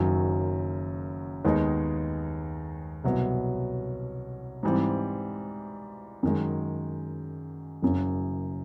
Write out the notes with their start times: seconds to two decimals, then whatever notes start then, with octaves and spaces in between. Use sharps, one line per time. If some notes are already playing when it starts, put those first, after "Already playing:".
Already playing: F#1 F#2 D#3 F#3
1.45 D#2 D#3 G#3 B3 D#4
3.04 C2 B2 F#3 B3
4.63 G#2 E3 G3 C4
6.23 F#2 D#3 G#3
7.82 F#1 F#2 C#3